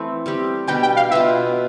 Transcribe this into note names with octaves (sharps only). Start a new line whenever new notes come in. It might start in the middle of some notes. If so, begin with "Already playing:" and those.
Already playing: E3 A3 C4
G3 C4 G4
B2 G3 D4 G4 G5
G5
F5
B2 B3 F4 E5